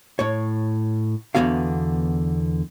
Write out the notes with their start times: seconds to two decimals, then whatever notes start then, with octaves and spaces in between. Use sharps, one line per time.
0.19 A2 C#5
1.35 E2 D3 E3 B3 F#4 F5